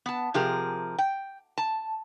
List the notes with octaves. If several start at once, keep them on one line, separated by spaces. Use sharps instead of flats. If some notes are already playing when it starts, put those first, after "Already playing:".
B3 A5
C3 F3 G4 G#4 A#4
G5
A5